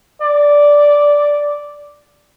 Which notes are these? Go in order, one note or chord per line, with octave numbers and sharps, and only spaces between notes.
D5